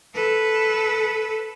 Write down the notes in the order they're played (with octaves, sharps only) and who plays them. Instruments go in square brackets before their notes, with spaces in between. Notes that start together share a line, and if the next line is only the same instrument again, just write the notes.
[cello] A4 B4